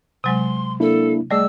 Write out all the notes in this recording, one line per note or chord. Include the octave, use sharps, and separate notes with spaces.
C3 F#3 G#3 C6
A#3 D4 E4 A4
G3 A3 G#4 D5 D#5 E6